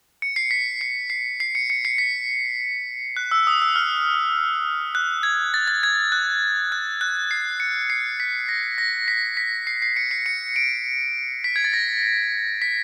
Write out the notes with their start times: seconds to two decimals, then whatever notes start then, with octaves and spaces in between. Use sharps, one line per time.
0.22 C#7
0.36 C7
0.51 B6
0.81 C7
1.10 C7
1.40 C7
1.55 C#7
1.70 C#7
1.85 C7
1.98 B6
3.17 F#6
3.31 E6
3.47 D#6
3.62 E6
3.76 F6
4.95 F#6
5.23 G#6
5.54 A6
5.68 A6
5.83 G#6
6.12 F#6
6.72 F#6
7.01 F#6
7.31 C7
7.60 C#7
7.90 C7
8.20 B6
8.49 A#6
8.78 A#6
9.08 B6
9.37 B6
9.67 C7
9.82 C7
9.96 C#7
10.11 C7
10.26 C#7
10.56 D7
11.44 B6
11.56 G#6
11.64 A6
11.73 A#6
12.62 B6